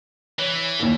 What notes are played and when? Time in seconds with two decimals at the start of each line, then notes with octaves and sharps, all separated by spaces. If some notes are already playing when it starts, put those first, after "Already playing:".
0.39 E3 C#5
0.79 D#2 A#2